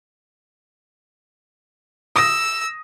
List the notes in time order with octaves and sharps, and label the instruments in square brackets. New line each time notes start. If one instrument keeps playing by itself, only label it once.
[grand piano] D#6 A#6 [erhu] E6